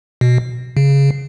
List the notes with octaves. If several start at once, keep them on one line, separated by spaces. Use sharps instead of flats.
B2
C#3